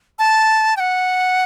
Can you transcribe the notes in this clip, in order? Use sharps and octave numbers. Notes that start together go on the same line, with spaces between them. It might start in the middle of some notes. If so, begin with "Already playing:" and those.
A5
G5
F#5